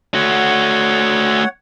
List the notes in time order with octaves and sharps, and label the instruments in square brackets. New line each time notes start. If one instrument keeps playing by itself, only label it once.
[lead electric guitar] A3 F#4 [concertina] C#5 F#5